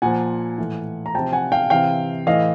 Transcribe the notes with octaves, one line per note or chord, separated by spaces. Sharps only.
A#2 F3 F#5 G#5
A2 E3
A#5
C3 F3 G5 A5
F#5 G#5
F5 G5
C3 E3 F5 G5
A2 E3 D#5 F5